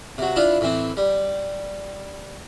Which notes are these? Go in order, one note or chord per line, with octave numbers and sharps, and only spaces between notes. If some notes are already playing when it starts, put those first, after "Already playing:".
C3 F#3
D4 E4 F4
A2 E3 C4
G3